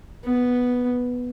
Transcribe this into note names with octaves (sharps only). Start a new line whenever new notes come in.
B3